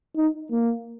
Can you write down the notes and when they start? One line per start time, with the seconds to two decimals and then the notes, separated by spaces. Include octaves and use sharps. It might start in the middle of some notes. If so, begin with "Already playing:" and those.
0.16 D#4
0.52 A#3